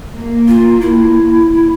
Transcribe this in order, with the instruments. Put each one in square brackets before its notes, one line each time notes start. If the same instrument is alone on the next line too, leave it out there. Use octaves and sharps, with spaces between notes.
[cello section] A#3
[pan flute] F4
E4